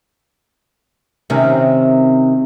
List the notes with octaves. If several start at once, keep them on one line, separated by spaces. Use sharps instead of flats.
C3 D#3 C#4